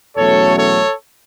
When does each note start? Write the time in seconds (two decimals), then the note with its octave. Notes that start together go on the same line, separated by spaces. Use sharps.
0.16 E2 B2 F#3 A3 C#4 A4 C#5
0.56 A4 C#5